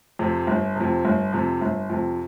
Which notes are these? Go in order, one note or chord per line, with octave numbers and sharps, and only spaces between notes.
F2 C3
G1
F2 C3
G1
F2 C3
G1
F2 C3